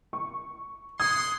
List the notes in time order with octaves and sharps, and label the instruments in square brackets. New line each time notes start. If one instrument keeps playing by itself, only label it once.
[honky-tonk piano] C#6
[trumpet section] F#5 C6 [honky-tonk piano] D#6 [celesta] G#6